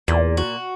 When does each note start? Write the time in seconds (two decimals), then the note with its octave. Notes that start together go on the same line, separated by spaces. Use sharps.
0.08 E2 A#2
0.37 F#4